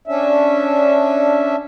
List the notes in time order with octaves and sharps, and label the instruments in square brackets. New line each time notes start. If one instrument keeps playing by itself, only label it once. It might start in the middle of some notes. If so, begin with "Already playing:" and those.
[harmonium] C#4 D4 E5